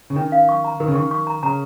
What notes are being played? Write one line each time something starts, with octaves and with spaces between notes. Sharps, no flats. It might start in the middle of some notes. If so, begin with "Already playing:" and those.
C#3
D#3 C#4
F5
C#6
A#5
D#3 A#4
C#3
D#3 C#6
C#6
A#5
C#3 A#5